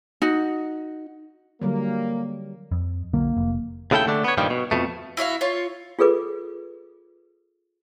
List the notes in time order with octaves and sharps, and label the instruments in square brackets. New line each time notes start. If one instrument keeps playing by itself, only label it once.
[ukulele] D#4 F#4
[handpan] D3 F#3 G3 [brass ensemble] A#3
[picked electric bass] F2
[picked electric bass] B1 D3 F#3 [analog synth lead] A#3
[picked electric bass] F1
[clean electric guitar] D#2 C#3 A3 E4 A4 G5
D3 A3 D4
B3 C#5
G2 A#2 D#3 F3 G3
B2
F2 B2 A3
[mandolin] E4 F#4 E5 F5
F4 C#5
[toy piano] F4 G#4 A4 B4 D6